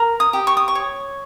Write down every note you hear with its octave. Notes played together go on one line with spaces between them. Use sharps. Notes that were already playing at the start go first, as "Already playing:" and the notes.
Already playing: A#4
D#6
G4
C#6
D#6
C#6
C#5